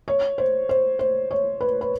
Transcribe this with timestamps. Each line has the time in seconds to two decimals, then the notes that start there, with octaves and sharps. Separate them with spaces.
0.08 C#5
0.38 C5
0.69 C5
0.99 C5
1.31 C#5
1.61 B4
1.81 B4